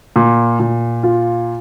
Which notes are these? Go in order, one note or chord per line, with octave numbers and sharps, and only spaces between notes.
A#2
A#2
F4